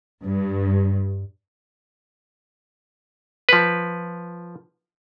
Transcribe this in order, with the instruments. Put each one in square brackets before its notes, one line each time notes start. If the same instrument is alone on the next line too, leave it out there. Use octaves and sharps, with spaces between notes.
[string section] G2
[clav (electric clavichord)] F3 B4